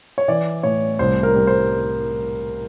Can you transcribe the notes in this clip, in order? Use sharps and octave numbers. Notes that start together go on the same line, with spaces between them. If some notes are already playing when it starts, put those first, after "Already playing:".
C#5
E3 D5
A2 C#5
C2 C5
A#4
G3
C5